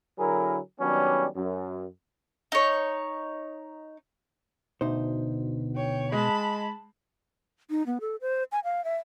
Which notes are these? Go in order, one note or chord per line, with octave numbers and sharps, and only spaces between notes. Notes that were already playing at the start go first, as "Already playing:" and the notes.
D3 F#3 E4 G#4 A#4
D#3 F#3 G3 B3 C#4 D4
F#2
D#4 C#5
D2 B2 D#4 C5
C#5 G5
G#3 A5 B5
D#4
B3
A4
C5
G#5
F5
E5